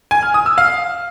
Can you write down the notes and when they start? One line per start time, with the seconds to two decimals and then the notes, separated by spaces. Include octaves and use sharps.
0.11 G#5
0.23 F6
0.34 D#6
0.46 E6
0.58 F5